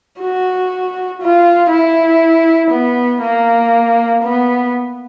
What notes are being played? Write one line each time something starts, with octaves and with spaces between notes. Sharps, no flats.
F#4
F4
E4
B3
A#3
B3